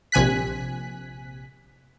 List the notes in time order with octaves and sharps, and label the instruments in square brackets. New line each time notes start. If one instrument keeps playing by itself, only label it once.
[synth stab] A#1 C3 G#5 F#6 B6